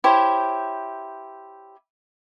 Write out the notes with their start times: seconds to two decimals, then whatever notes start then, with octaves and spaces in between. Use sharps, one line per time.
0.04 E4 G4 C5 C#5